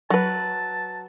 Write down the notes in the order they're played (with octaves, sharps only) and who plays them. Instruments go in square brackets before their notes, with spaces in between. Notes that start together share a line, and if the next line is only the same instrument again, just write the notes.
[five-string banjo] F#3 B4 [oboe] A5